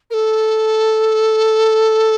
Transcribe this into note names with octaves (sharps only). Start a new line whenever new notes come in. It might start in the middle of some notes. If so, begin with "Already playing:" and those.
A#4
A4